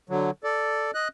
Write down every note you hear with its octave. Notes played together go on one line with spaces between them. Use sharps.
D3 F#3
A4 D5
D#5 F#6